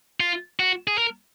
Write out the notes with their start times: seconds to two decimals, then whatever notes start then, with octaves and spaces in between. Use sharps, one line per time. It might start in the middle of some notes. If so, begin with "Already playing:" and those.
0.20 F4
0.60 F#4
0.87 G#4
0.98 A#4